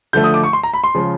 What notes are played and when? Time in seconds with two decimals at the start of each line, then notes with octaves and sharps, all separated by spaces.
0.13 D3 F3 A3 G6
0.24 D#6
0.34 D6
0.44 C#6
0.53 C6
0.63 A#5
0.74 B5
0.84 C6
0.95 C#3 F3 G#3